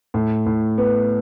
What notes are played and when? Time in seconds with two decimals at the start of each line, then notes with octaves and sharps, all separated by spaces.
0.14 A2
0.46 A2
0.78 B3